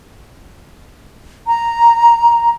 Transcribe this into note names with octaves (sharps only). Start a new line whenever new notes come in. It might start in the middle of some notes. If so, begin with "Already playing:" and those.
A#5